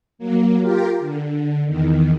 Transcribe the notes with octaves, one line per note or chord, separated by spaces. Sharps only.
F#3 A#3
F4 G4 A#4
D3
E2 D#3